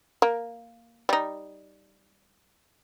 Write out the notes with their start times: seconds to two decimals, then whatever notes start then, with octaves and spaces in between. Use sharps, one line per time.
0.22 A#3
1.09 G3 D#4